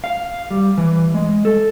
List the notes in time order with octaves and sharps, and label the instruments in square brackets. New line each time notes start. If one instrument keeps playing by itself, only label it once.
[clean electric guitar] F5
G3
E3
G#3
A4